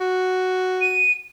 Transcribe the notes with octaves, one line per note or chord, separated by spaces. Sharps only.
F#4
D#7